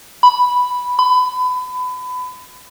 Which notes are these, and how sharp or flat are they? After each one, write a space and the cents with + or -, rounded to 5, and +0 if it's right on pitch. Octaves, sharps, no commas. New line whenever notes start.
B5 +0
B5 +30